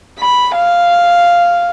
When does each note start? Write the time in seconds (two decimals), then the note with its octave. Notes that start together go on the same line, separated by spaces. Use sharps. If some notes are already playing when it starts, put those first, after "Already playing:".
0.19 B5
0.55 F5